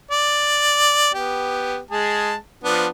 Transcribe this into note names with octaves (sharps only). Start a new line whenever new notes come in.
D5
B3 G4
G#3 G#4 A5
F3 B3 D4